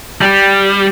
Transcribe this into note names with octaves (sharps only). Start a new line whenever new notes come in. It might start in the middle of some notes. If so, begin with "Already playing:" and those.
G3